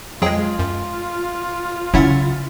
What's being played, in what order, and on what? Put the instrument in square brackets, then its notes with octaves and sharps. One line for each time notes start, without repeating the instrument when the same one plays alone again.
[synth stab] F2 G#3 [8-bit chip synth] F#3 G#4 G5 [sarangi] F4
[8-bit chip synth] F#2
[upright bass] C#3 [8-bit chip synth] F#3 E5 F#5 [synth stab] C#4 E4 A6